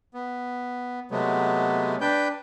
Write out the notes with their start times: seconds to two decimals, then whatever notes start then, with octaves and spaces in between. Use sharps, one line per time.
0.14 B3
1.11 C3 F#3 G#3 A3 B3
2.01 D4 B4 G5 G6